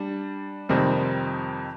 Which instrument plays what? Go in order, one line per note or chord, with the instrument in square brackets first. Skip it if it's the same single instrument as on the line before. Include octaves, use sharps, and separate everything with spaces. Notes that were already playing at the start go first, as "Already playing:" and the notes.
Already playing: [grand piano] G3 D4
F2 C3 D#3 G3 C4